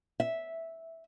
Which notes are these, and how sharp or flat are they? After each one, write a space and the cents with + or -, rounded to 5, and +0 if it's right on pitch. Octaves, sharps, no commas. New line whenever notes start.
E5 -10